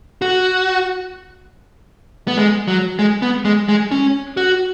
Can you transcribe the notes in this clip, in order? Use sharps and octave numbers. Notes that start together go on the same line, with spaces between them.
F#4
B3
G#3
F#3
G#3
B3
G#3
G#3
C#4
F#4